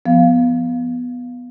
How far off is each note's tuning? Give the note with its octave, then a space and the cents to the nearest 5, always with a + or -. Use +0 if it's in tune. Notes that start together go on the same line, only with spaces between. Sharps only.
F3 -10 B3 +0 F5 +0